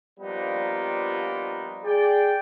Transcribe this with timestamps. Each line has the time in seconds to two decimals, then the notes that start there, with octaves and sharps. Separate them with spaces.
0.20 F3 G3 A#3 B3 D4 D#4
1.83 G#4 D5 G5